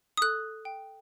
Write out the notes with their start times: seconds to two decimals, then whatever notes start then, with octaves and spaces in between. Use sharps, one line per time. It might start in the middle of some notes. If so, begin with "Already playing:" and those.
0.17 D#6
0.22 A4 F#6
0.65 G5